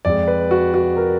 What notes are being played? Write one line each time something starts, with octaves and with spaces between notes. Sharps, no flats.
F2 F3 G#3 D5
B4
F#4
F#4
A#4